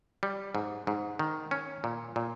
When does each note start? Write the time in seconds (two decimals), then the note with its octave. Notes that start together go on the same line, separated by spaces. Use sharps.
0.23 G3
0.55 G#2
0.87 G#2
1.19 D#3
1.51 C#4
1.84 A#2
2.16 A#2